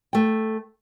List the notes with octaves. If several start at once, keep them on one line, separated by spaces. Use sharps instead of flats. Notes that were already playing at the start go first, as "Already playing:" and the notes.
A3 G5